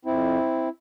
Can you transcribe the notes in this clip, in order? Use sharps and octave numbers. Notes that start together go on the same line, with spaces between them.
F2 C4 E4